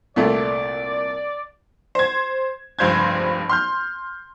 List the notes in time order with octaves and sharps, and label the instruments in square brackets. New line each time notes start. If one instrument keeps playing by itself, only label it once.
[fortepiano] C2 A#2 A3 [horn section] D5
[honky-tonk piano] C5 G#6
F1 C#2 G2 C5 G6 G#6
C6 F6 G6